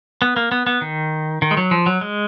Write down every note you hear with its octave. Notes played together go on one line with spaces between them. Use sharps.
B3
A#3
B3
B3
D#3
D#3
G#3
F#3
F3
F#3
G#3